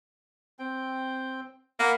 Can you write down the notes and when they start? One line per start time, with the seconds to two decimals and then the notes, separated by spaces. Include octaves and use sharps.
0.59 C4 G5
1.80 A#3 F#5 B5